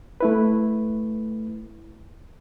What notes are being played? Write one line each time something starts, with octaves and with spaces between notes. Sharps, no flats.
A3 E4 B4